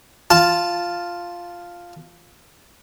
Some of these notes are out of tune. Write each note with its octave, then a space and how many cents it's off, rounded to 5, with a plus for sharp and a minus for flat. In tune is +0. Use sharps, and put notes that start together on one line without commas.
F4 +0 A5 +0